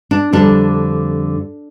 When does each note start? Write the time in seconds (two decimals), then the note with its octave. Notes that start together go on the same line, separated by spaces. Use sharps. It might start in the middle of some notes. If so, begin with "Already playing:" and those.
0.11 D4
0.33 F2 D3 G3 D4